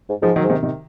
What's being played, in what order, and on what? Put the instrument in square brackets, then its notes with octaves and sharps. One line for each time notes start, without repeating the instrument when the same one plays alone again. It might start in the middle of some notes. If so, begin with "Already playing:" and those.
[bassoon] G#2
[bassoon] G#2 [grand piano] F3 G#3
[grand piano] D#3 F#3
[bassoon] G#2
[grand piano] C3 D#3
C3 D#3